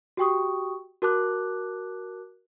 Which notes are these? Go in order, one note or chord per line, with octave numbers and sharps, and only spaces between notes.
F#4 G4 G5 C#6 D#6
F#4 A#4 A5 D6 F#6